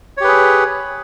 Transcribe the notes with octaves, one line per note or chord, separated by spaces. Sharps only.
G4 G#4 B4 C#5